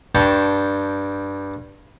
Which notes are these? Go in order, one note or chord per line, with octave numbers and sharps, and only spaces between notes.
G2 G5 A5 C#6